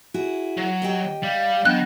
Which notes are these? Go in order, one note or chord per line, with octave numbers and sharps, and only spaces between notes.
E4 F#4 G#4
F#3
G4 D#5 G5
G3 F5
F#3 B3 D4 D#5 G5 F#6